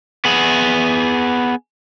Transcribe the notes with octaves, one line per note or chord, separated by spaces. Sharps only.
B3 G#4